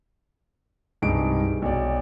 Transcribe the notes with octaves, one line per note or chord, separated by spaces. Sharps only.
C2 G2 D#4 G#4 D7
B1 D5